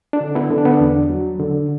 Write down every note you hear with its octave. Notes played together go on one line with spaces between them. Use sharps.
D4
D3
B3 E4
D3
D4
B3
D4
E2
F#3
D3